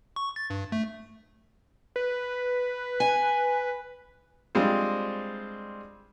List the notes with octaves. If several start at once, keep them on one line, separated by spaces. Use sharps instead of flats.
C#6
A6
G2
A3
B4
G#5
G3 G#3 C4 D4 F4 C5